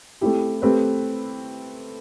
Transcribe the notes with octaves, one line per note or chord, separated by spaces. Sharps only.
A3 C4 E4 G4
A3 C4 G4 B4